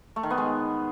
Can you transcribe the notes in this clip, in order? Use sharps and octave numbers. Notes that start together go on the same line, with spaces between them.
A3
D#3
B3
G#3